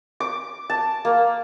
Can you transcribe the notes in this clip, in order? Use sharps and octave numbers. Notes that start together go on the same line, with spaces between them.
D6
A5
A#3